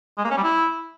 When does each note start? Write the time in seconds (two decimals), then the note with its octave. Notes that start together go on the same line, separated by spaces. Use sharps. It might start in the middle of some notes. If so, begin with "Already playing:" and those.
0.18 G#3
0.24 A#3
0.31 C#4
0.37 G3
0.43 E4